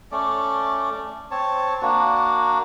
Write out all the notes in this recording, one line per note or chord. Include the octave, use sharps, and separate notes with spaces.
A3 C#4 D5
C4 C#5 A5
A#3 D4 F#4